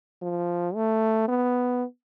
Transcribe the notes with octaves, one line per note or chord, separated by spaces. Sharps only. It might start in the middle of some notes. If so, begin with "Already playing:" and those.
F3
A3
B3